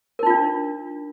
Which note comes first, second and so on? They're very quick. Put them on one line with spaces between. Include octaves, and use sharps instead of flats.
A#4 D#4 F4 D4